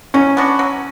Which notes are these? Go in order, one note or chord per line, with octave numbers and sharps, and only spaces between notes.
F#3 C#4
B3 D4 F#4
F#3